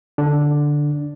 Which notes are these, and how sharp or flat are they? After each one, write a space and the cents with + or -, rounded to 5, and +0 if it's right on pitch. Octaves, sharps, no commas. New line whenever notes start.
D3 +0 D4 +0